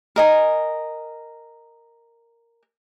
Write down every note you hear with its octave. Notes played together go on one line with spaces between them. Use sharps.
A#4 D#5 G#5